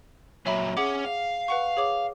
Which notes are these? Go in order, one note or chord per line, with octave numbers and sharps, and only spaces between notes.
A#2 F#3 C#5 E5 B5
C#4 G#4 F#5 D6
F5
B4 F#5 C#6
G#4 C#5 D6